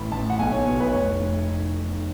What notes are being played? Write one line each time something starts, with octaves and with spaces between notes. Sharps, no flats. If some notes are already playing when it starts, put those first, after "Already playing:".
Already playing: A1 B5
A1 A5
F#5
B1 G#5
C#5
B2 C#5
B4
F1 C#5
F1